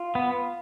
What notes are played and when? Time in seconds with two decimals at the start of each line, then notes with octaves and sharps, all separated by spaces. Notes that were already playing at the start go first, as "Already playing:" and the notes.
Already playing: F4
0.15 B3